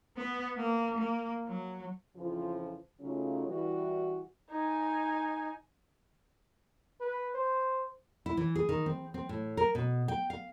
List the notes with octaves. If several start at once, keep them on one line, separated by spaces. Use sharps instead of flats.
B3
A#3
A#3
F#3
F2 C#3 E3 F3
C#3 F#3 A3 C#4 D#4 F4
E3 G3 F#4
D#4 G#5
B4
C5
E4
E3
G#4
D#3
C4
C4
A2
A#4
B2
G5
F5